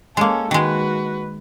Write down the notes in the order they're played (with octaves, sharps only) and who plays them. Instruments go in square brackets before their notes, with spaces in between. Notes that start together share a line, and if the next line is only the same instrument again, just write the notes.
[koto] G#3 A#3 [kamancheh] C#4 A4
[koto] D#3 G#3 [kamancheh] F#4 B4